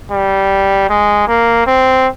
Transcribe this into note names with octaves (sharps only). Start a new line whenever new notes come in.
G3
G#3
A#3
C4